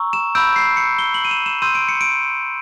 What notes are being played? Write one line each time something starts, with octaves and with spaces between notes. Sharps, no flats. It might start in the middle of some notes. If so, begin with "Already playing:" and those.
Already playing: A#5 C#6 E6
E7
B5 E6 G6 D7
C7
C#7
G7
F#7
D#7
E7
E7
C6 E6 G6 D#7
D7
C#7
D7